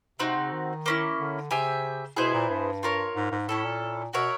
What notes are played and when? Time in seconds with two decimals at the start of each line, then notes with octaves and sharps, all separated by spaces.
0.19 C3 C4 D#4 F#4
0.37 C#3
0.52 D#3
0.86 A#3 C#4 E4
1.18 D3
1.51 C#3 G4 C5 E5 G#5
2.16 B2 B3 E4 G#4 C5
2.34 A#2
2.50 G2
2.83 F4 A#4 C#5
3.15 G#2
3.31 G#2
3.48 A2 C#4 E4 A4
3.64 A#2
4.13 B2 F#4 A#4 C#5 E5